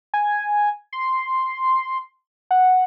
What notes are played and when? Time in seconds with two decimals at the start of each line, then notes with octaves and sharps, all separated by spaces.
0.14 G#5
0.93 C6
2.51 F#5